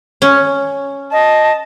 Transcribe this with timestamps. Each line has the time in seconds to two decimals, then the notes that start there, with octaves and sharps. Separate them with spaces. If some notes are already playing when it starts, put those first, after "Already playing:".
0.22 C#4
1.12 D#5 A5